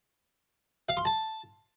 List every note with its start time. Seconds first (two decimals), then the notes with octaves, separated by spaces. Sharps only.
0.89 F5
0.97 C6
1.05 A5